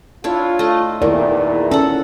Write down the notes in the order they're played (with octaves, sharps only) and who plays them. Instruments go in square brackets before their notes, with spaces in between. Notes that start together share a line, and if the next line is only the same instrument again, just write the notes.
[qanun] D4 E4 C#5 [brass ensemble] F4
[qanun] A3 D#5
[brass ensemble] E2 A#2 [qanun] D#3 [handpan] E4 A#4 D5
[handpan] C#4 [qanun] A4 F#5